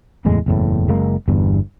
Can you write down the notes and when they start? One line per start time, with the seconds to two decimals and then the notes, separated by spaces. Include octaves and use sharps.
0.25 F#1 E2 A2 G#3
0.46 F#1 E2 A2
0.88 F#1 G#3 A#3
1.28 G1 E2 G2